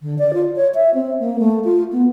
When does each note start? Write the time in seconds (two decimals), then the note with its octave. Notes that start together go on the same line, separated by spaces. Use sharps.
0.01 D3
0.19 D5
0.34 F4
0.56 C#5
0.75 E5
0.94 C4
1.20 A#3
1.39 A3
1.65 F4
1.92 B3